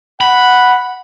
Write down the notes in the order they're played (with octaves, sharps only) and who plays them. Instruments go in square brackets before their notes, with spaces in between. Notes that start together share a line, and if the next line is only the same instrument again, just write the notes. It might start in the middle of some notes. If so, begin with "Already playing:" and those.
[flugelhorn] F#5 [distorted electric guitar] B5